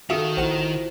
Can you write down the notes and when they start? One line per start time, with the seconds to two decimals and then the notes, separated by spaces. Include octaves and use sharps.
0.10 D#3 F#4 A4 E5 F5 D#6
0.37 A#1 E4 F4 C5 F#5 E7